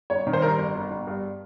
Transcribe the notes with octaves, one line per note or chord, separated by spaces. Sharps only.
G1 C#5
D#3
C5
G2 A#4
G1
G1
G1
G2